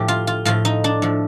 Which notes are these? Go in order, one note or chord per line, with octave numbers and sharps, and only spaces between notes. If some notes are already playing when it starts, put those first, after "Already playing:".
Already playing: A2 F3 G4
F4
F4
A2 F3 F4
D#4
D4
A2 F3